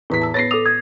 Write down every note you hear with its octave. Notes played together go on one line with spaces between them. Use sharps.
E2 A2 B4 B6
A5 E6
B3 B4 C#5 A6 A#6 C7
A4 D6 D#6 F7
D#6 G#6